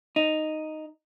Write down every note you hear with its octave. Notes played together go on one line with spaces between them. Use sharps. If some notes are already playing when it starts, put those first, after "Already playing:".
D#4